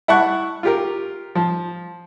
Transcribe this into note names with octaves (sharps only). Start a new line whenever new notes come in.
E4 F#5 A5 C#6 F#6
F4 G4 A#4
F3